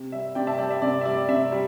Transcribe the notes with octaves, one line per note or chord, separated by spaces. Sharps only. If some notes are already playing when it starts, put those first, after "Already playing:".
Already playing: C3
G3 E5
C3 D5 G5
E5 A5
G3 D5 G5
E5
C3 D5
E5
G3 D5
C3 E5
G3